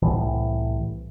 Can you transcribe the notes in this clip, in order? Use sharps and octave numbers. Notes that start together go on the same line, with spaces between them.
C2 A2 E3